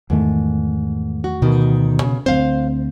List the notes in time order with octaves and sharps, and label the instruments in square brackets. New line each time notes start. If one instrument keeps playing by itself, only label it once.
[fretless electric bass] E2 D#3 A3 [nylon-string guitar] G#2
[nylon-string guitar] F#4
[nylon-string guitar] D2 D#3 [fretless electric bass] B2
[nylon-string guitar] C#3
[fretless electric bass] D2 C4 [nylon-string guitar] C5 F5